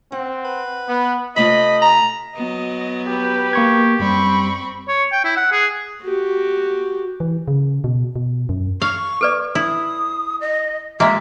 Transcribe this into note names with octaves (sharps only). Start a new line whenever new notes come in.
C4 F#5
B4
B3
C3 A3 F4 D#5 B5
A#5
F#3 B3 D#5
G4 B4
A#3 C#6 G#6
F#2 G3 C4 B5 C#6
C#5
G5
E4
F#5
G#4
F#4 G4
E3
C#3
B2
B2
F#2
F5 C#6
A4 B4 D5
E4 D#6
D#5
G#3 A#3 F#4 D#5 E5